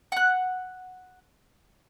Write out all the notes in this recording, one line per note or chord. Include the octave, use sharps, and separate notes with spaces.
F#5 F#6